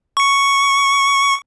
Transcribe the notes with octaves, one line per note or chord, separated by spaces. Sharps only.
C#6 C#7